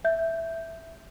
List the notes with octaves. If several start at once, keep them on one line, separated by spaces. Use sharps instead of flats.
E5 G6